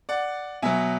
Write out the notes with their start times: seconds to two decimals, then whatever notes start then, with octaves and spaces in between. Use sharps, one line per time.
0.09 D5 F#5
0.62 B2 F#3 E5 G#5